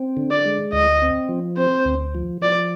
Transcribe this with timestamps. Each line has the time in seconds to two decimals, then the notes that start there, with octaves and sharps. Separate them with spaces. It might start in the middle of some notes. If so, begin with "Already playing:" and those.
Already playing: C4
0.17 D3
0.31 D5
0.45 G#3
0.73 D2 D#5
1.02 C4
1.29 F3
1.57 C4 C5
1.85 D2
2.15 F3
2.42 F3 D5